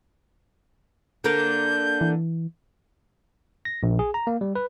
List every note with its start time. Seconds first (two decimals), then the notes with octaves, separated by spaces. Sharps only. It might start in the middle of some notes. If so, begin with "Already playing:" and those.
1.24 D3 A#3 A#4 G6
2.01 E3
3.65 A#6
3.83 A#1
3.99 G#4
4.14 A#5
4.27 A#3
4.41 G3
4.55 B4